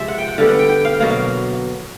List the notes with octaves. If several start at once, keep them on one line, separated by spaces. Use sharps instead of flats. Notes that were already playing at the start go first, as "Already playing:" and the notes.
Already playing: C3 F3 G#3 E5
F#5
G5
F#5
D3 G3 B3 F5
F#5
G5
G5
F5
B2 F#3 A#3 F5
F5